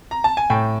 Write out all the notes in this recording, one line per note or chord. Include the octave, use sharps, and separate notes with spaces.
A#5
A5
G#5
A2 G5